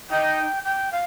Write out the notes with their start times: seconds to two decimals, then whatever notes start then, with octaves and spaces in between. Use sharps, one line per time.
0.10 D#4 G5
0.64 G5
0.92 F5